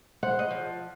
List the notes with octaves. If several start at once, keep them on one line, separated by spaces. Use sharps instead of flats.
C5 F#5
D#5
F3